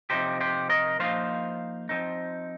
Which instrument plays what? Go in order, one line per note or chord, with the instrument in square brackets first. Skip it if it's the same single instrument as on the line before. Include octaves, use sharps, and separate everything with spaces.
[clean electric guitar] C3 F3 D#4 G4 C5
G4 C5
A#4 D#5
F3 A#3 D#4 C5 F5
F3 C4 D#4